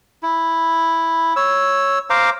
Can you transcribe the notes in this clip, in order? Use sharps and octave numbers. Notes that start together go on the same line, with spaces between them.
E4
C#5 E6
C5 F5 A#5 D6